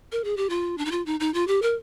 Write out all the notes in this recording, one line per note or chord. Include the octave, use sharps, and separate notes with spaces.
A#4
G#4
G4
F4
D4
D#4
F4
D#4
D#4
F4
G4
A#4